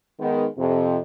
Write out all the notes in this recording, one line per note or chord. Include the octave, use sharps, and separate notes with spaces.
D#3 G#3 B3
F2 C3